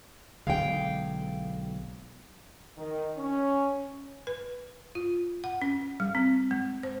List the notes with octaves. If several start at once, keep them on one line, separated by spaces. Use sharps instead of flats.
B1 D3 G#3 F5 G5
D#3
C#4
B4
F4
F#5
C#4
G3
C4
G#3
C5